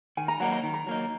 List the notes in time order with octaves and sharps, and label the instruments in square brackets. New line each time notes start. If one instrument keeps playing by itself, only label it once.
[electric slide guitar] D#3 [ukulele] G#5
[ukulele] A#5
[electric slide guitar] F#3 A#3 D#4 [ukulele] F#5
[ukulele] A#5
[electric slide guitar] D#3
[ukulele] A#5
[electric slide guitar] F#3 A#3 D#4